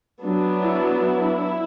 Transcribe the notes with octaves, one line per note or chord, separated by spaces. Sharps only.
F#3 B3 D4
E4
E4